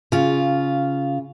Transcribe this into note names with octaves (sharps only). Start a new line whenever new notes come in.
C#3 F4